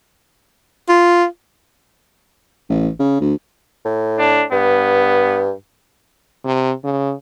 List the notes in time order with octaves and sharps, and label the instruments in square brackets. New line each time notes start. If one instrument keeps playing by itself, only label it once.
[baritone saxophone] F4
[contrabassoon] A1
C#3
D2
[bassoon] A2
[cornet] D4
[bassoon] G2 [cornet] B3
[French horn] C3
C#3